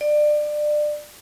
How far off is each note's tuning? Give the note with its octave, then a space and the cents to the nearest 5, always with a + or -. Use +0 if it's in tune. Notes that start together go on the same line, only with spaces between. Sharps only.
D5 +25